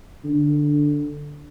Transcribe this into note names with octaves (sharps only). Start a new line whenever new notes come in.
D3